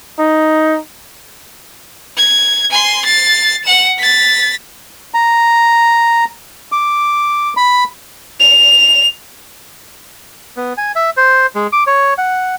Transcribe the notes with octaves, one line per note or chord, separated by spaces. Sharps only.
D#4
G#6
G#5 C6
A6 C7
F#5 E7
A6 B6
A#5
D6
B5
F7
B3
G#5
E5
C5
G#3
D6
C#5
F#5